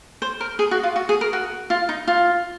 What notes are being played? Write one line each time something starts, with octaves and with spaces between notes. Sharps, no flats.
C5
A#4
G#4
F#4
F4
F#4
G#4
A#4
F#4
F4
D#4
F4